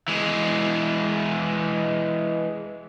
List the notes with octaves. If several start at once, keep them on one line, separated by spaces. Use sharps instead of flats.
E3 G#3